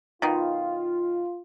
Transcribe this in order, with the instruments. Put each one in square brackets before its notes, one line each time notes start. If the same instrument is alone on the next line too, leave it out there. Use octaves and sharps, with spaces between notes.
[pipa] B2 D#3 [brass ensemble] F4